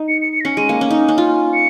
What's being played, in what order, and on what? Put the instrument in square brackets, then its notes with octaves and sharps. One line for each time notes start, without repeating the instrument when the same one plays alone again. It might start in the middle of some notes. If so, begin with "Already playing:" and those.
Already playing: [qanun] D#4
[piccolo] C#7
C#7
C#7
A#6
[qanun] C#4 [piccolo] C#7
[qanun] G#3 [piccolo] D#7
[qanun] A#3
C#4
D#4
C#4
F4
[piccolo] C#7